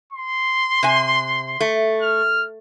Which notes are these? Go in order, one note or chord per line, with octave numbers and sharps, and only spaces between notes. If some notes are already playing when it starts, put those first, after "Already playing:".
C6
C3 G#5
A3
F6